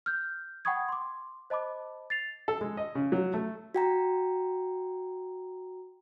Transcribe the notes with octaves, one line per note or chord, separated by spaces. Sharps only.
F6 G6
F#5 G5 B5 C#6 D#6 G#6
C6 D6
C5 D#5 A5 B5 D6
A6 C7 F7
A4
G#3
D#5
C#3
F#3
A3
F#4 G5 A#5